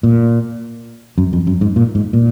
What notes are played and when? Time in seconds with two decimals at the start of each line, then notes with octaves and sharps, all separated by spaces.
0.03 A#2
1.18 F#2
1.33 F2
1.47 F#2
1.61 G#2
1.76 A#2
1.95 G#2
2.13 A#2